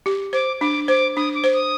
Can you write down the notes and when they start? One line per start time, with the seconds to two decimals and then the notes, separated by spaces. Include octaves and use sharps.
0.06 G4
0.33 C5 D6
0.61 D4 D6
0.88 C5 D6
1.16 D4 D#6
1.35 D6
1.44 C5
1.53 D#6